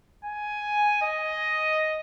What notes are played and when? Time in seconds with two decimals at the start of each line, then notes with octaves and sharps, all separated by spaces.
0.25 G#5
1.02 D#5